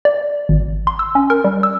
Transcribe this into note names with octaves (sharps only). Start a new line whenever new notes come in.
D5
G#1
C6
E6
C#4
A#4
G3
E6